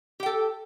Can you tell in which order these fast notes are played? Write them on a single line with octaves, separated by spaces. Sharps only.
G4 G5 A4